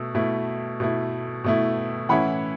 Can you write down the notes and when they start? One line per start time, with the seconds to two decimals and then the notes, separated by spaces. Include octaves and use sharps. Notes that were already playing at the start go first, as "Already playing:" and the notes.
Already playing: B2 A3 E6
0.15 B2 A3 E4
0.80 B2 A3 E4
1.44 B2 A3 E4
2.09 A2 E3 C#4 E4 F#5 B5